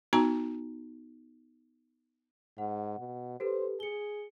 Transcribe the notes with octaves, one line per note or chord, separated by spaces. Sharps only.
B3 D#4 F#4 A5 A#5
G#2 F#5
B2
G4 A4 B4 C5
G#4 C#7 G7